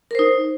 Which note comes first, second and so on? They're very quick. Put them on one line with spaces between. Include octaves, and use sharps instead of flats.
A#4 C5 D#4